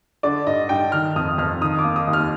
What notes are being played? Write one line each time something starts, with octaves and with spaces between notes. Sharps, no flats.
D3 D5
G2 D#5
G2 G5
D#3 F6
F2 D#6
F2 F6
D#3 D#6
D6
A#3
D#6
D#2
F6